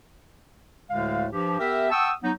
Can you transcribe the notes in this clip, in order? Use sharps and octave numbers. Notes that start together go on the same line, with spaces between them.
D2 A2 D3 G#3 A3 F5
G2 F3 G4
B3 G4 A#4 E5
F#5 G5 A5 C#6 D#6 E6
F#3 B3 D#4